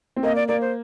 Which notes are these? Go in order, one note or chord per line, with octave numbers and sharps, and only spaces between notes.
C4
A#3 D#5
D5
A#3 D5
C5